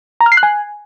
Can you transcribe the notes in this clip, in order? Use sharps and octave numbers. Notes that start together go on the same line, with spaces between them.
A#5
F6
C7
F#6
G#5